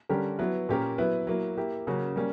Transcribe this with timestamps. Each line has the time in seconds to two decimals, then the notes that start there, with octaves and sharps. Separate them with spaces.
0.09 D3 G3 C#4 G4 A#4
0.39 F#3 B3 E4 B4
0.69 A#2 A#3 C#4 G4 A#4
0.98 F#3 B3 E4 B4
1.27 F#3 A#3 E4
1.57 A#3 E4 G4
1.87 C#3 F#3 A#3 C#4 F#4
2.16 G3 A#3 C#4